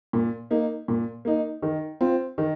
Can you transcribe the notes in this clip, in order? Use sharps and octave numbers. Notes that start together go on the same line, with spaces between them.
A#2
A#3 D#4
A#2
A#3 D#4
D#3
C4 F4
D#3